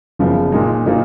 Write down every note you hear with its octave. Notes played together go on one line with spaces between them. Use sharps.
F#1 F#2 C#3 F3 B3
A#2 G#3 D#4
A#2 F#3 A#3 D#4